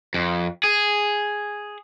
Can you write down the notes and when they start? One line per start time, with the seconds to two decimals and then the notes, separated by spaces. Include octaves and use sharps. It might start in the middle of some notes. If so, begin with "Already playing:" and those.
0.14 F2
0.64 G#4